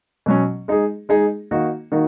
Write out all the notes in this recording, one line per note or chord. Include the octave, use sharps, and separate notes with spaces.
B2 F#3 C#4
G#3 D#4 G#4
G#3 D#4 G#4
D#3 A#3 D#4 F#4
D#3 A#3 D#4 F#4